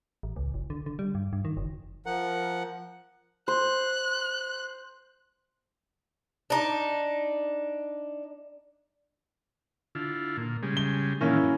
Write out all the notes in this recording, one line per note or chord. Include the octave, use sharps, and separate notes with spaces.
A1
C#2
F#1
D3
D3
G3
G2
G2
D#3
F#1
F3 A#4 F#5
C5 F#6
D4 D#4
D3 E4 F4
A#2
C#3 G3 G#3
G7
A#2 D#3 E3 A#3 C#4 E4
F#2